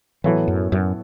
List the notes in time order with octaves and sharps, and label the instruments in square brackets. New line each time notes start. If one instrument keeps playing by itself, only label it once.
[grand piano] A2 F#3 B3 A4 C#5 [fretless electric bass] E3
[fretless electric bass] F#2
F#2